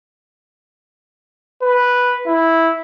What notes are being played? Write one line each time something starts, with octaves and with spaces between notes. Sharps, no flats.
B4
E4